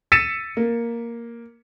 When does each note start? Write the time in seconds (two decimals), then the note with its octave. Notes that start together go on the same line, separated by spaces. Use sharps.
0.12 E6 A6 B6 C#7 D#7 E7
0.57 A#3